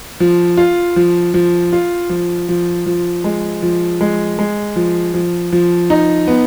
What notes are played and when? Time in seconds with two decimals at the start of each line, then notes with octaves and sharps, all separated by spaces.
0.20 F3
0.57 F4
0.96 F3
1.34 F3
1.73 F4
2.10 F3
2.49 F3
2.86 F3
3.24 G#3
3.62 F3
4.01 G#3
4.39 G#3
4.76 F3
5.14 F3
5.52 F3
5.90 D#4
6.27 B3